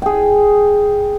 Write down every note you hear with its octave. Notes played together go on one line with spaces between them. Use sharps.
G#4 G5